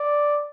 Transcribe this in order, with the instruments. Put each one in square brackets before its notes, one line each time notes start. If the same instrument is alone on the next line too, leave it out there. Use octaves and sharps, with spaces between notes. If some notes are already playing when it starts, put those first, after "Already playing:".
Already playing: [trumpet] D5